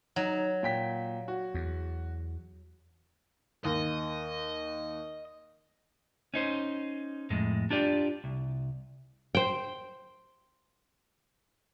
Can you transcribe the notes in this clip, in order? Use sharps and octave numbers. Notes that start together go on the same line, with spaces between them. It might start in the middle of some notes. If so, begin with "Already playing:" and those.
F#3 D#4
A#2 G5 B6
F#4
E2
D#2 D#5
C#4 D#4 C5
F2 A2 G#3
D4 F4 G4 D5
C2
C5 G5